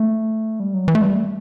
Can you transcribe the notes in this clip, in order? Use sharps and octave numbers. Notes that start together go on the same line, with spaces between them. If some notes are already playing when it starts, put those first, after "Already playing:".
Already playing: A3
G3
F#3
E3
A3
G3
A3